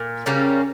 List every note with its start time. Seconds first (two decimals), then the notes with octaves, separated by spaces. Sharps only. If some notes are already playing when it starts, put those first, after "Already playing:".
Already playing: A#2
0.26 C#3 G3 A#3 C#4